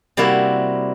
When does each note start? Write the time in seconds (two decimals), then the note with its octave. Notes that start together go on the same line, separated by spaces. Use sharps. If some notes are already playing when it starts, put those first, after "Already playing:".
0.17 C3 G3 A#3 E4 F#4